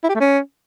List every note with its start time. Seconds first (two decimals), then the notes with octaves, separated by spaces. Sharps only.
0.03 E4
0.09 G4
0.14 A3
0.20 C#4